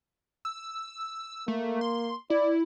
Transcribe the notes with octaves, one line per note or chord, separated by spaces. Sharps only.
E6
A3 A#3
C6
E4 D5